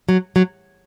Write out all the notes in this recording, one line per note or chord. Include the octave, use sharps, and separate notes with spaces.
F#3
F#3